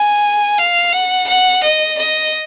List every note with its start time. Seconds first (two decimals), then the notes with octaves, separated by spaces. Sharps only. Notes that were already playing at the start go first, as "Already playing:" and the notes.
Already playing: G#5
0.58 F5
0.93 F#5
1.28 F#5
1.63 D#5
1.98 D#5